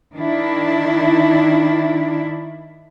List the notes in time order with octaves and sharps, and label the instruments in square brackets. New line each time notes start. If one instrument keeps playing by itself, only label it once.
[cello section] D#3 D4 E4